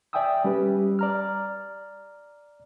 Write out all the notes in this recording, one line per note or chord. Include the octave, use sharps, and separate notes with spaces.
D5 E5 G5 G#5 D#6 E6
G3 C#4 G4 B4
D5 A#5 F6